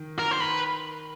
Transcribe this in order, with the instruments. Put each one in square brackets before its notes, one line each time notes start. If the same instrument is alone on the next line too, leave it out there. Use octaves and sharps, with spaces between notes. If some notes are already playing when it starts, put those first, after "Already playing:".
Already playing: [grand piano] D#3
[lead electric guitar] A#4
C5
B4